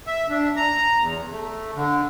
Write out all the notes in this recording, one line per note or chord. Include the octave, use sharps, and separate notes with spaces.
E5
D4
A#5
E2
A3
D3